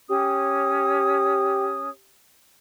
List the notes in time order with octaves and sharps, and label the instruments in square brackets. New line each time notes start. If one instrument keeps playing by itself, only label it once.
[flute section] C#4 C#5 D#6 [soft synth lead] G4